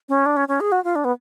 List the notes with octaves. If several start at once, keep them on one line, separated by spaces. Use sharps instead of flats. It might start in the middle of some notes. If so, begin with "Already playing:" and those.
C#4
D4
C#4
C#4
G#4
F#4
F4
D4
B3